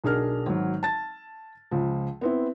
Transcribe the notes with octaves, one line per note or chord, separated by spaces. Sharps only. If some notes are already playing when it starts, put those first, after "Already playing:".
B1 D4 G#4 A#4 F6
G#1 F#3
A5 A6
C#2 F3
B3 C4 E4